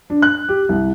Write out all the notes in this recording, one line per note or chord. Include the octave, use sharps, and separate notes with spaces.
D4
F#6
G4
C2